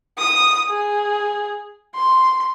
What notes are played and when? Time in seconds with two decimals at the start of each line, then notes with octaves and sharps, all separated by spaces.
0.18 D#6
0.69 G#4
1.95 C6